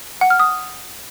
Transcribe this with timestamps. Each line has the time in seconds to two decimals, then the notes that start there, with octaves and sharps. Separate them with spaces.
0.21 F#5
0.30 F6
0.40 D#6